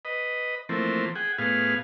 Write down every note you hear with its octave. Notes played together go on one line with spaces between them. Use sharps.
B4 D#5
E3 F3 A3 A#3 C4
G#4 F#5 G5
A2 B3 G#4 F5